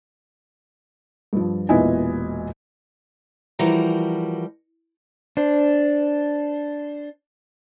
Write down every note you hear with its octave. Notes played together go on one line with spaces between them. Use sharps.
G2 F3
E1 A#2 B3 E4 D#5 G#5
E3 F3 G3 F#4 A#4 A#5
D4 C5